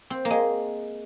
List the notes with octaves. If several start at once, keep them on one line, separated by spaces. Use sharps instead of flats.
C4
A#3
G#3